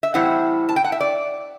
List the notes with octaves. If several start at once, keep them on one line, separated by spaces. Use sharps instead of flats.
E5
A2 E3 G3 C4 E4 F#5
A5
G5
F#5
E5
D5